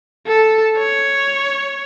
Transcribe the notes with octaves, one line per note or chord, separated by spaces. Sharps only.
A4
C#5